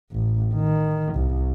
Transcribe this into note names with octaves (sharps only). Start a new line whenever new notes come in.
A1
D#3
C2